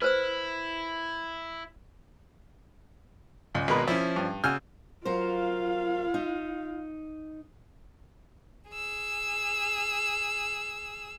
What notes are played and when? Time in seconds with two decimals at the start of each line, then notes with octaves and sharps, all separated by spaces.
0.02 E4 B4 C5 E6
3.55 C#2 G#2
3.68 G#1 B2 G#3 A#4 B4 B5
3.88 F3 C#4 E4
4.16 G2
4.44 C#3 F#4 G#5 E6 F6 G6
5.05 F#3 F4 A#4 C5 F5
6.14 D#4
8.71 G#4 E6